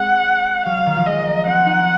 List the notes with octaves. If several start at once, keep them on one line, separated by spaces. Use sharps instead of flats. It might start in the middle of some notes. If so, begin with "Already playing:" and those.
Already playing: G#3 C4 F#5
F#3 F5
D#3
F3
G#3 D#5
A#3
C4 F#5
D#4